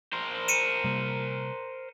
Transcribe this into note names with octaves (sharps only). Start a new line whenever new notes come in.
A#4 C5
C#7 D#7 E7
C3 G3 A#3